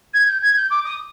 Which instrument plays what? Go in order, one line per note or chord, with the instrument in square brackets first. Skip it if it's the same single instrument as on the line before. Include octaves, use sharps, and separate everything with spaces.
[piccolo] G#6
G6
G#6
G6
D6
D#6